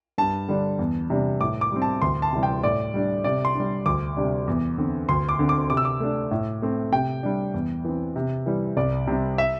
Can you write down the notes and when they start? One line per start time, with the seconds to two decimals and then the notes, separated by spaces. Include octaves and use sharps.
0.18 G2 A5
0.48 D3 G3 D4
0.79 E2
1.10 C3 G3 D4
1.41 A2 D6
1.61 D6
1.72 G3 C4
1.82 A5
2.02 D2 C6
2.22 A5
2.33 C3 E3 G3
2.43 G5
2.63 A2 D5
2.94 G3 D4
3.24 C3 D5
3.45 C6
3.55 D4
3.60 G3
3.86 D2 D6
4.17 C3 G3 D4
4.48 E2
4.78 D3 C4
5.09 D2 C6
5.29 D6
5.39 D3 C4
5.49 D6
5.70 C3 D6
5.77 E6
5.85 D6
6.00 A3 D4
6.31 A2
6.62 A3 C4
6.92 C3 G5
7.23 G3 D4
7.54 E2
7.85 E3 C4
8.16 C3
8.46 E3 G3
8.77 C2 D5
9.07 C3 G3 C4
9.38 E5